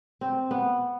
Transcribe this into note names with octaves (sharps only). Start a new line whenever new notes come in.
C4
B3